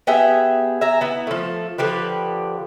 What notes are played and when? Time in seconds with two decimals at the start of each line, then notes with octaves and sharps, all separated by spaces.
0.07 B3 G4 G#4 E5
0.81 E5 G#5 A#5
1.01 B3 E4
1.27 F3 A3
1.78 D3 F3 G4 B4